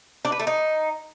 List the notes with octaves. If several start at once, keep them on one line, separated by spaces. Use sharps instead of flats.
D4
B4
A3
D#4